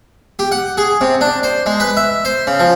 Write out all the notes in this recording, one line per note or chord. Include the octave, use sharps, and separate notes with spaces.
G4
F#5
G#4
C3
D4
C5
G#3
B4
E5
C5
C#3
F3